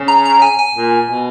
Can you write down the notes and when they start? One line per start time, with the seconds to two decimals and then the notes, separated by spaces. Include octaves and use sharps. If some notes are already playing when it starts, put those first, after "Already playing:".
Already playing: C#3
0.08 A#5
0.25 A#5
0.42 G#5
0.59 G#5
0.75 A#2
1.10 B2